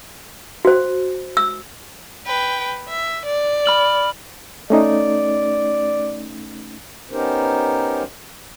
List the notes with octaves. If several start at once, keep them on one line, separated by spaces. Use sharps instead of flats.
F#4 C5
E6
B4 G5
E5
D5
B5 F6 F#7
A3 C#4 D#4 D5
B3 C#4 D#4 G4 A#4 C5